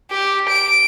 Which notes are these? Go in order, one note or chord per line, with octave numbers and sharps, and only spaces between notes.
G4
D7